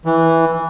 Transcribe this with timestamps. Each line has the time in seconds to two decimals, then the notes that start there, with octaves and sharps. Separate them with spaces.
0.06 E3